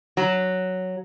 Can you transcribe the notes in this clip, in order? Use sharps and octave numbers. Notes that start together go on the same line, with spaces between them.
F#3